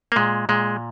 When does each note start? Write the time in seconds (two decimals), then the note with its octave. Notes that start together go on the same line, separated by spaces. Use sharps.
0.12 A#3
0.16 A#2 G#3
0.49 A#2 G#3